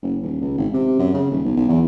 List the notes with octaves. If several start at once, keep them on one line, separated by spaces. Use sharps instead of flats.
F#1
D#1
C#2
G#1
C3
F#2
C#3
D#1
B1
B1
E2